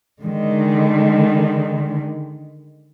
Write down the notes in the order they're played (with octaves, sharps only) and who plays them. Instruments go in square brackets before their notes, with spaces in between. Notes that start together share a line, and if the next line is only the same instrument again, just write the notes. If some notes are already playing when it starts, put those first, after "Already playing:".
[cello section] D3 D#3 G#3